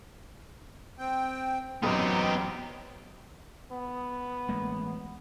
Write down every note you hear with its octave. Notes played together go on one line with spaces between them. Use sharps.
C4 G5
A1 F#2 F#3 B3 C4 D#4 G4 D#6
B3
A1 G#3 A#3